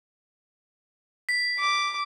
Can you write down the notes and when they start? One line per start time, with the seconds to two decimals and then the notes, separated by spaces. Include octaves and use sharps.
1.29 B6
1.59 D6